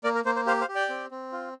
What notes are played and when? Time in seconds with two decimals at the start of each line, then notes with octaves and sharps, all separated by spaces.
0.04 A#3 A#4 D5
0.15 A#4
0.25 A#3 C5
0.36 C5
0.46 G4 C5 F5
0.61 C5 F5
0.69 G4
0.75 D5 G5
0.89 C4
1.11 C4
1.32 F4